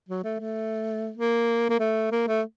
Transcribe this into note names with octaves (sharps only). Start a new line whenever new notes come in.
F#3
A3
A3
A#3
A#3
A3
A#3
A3